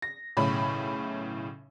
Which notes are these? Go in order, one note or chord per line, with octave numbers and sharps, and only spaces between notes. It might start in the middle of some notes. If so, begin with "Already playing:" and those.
A#6
B1 A2 C#3 E4 C#5 B5